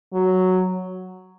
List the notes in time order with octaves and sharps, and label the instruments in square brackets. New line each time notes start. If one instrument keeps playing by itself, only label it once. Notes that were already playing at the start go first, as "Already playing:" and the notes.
[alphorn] F#3